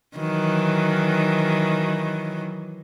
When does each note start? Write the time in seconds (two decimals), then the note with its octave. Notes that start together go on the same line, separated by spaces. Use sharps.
0.17 D#3 E3 F#3